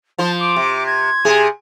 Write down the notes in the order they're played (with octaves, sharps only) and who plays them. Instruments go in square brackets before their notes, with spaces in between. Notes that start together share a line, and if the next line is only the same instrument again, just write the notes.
[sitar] F3 C5 [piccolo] A5
[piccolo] D6
[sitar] C3
[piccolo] G#6
[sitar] C3 G#4